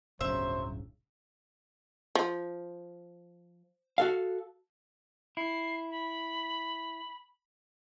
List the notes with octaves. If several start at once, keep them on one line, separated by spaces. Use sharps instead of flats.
D1 G1 C#3 F#3 C5 E5
F3
F#4 A4 F5
E4 C7
B5